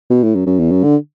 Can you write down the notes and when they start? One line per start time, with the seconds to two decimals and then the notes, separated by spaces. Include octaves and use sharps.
0.10 B2
0.23 A2
0.35 F#2
0.47 F#2
0.59 E2
0.71 F#2
0.83 D3